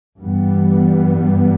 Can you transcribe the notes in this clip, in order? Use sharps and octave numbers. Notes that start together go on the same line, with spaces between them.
G2 E3 G3 B3